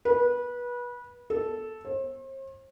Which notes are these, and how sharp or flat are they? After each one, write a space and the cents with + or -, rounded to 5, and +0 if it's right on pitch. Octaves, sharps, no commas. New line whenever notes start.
B4 -25
A4 -10
C5 +45